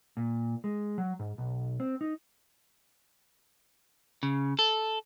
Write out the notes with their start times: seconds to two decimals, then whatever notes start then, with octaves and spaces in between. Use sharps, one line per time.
0.17 A#2
0.64 G#3
0.98 F#3
1.19 G#2
1.38 B1
1.80 C4
2.01 D#4
4.23 C#3
4.59 A4